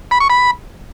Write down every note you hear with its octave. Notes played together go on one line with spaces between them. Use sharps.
B5
C#6
B5